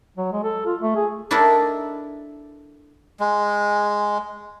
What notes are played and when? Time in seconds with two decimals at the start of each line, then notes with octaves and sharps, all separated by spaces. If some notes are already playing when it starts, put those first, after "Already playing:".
0.17 F#3
0.32 G#3
0.43 A4
0.66 F4
0.81 A3
0.95 G#4
1.31 D4 E4 A4 A#4 D#5
3.20 G#3